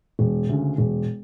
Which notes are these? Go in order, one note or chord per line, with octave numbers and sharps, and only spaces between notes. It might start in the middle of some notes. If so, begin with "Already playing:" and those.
E1
D2 C#3
E1